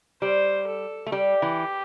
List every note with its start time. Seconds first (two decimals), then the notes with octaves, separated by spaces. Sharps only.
0.21 G3 C5
0.67 A4
1.06 A3
1.12 G3 G4
1.42 E3